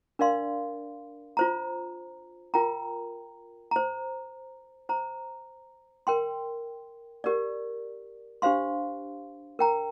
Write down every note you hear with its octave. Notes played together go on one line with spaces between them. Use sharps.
D4 A#4 D5 F5 C6
F4 C5 A#5
F4 A#4 G5 A#5
C5 A#5
C5 A#5
A#4 G5 C6
G4 A#4 D5
D4 G4 C5 F5 C6
A#4 G5 A#5